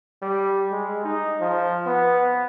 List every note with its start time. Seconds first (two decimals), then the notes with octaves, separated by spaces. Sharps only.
0.22 G3
0.71 G#3
1.05 D#4
1.41 F3
1.86 B3